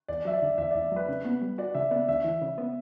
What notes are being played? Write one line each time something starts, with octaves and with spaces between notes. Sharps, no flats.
E2 D5
F#3 E5
D5
D3
E2 E5
E2 D5
F#3 B4
C#3
B3
G3
F#4 D5
C#3 E5
B3 D5
D2 E5
E3
C#3
B3